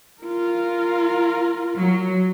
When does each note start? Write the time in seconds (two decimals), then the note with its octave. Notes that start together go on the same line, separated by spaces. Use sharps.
0.22 F4 A#4
1.76 F#3